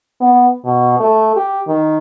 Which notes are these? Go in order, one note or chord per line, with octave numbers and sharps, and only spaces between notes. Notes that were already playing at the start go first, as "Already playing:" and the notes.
B3
B2
A3
G4
D#3